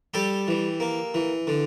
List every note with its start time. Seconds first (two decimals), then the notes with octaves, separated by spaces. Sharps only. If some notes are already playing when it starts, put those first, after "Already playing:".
0.14 G3 G4 A4
0.48 E3
0.80 A#3
1.14 E3
1.47 D3